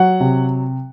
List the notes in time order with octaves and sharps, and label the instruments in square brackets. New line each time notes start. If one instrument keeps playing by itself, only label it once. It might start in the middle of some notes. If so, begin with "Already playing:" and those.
Already playing: [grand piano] F#3 F#5
C3